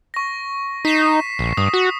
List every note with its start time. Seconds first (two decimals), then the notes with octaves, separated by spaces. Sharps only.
0.14 C#6 A#6
0.85 D#4 B6 C7 E7
1.39 A#1
1.57 G2 D#6
1.74 F#4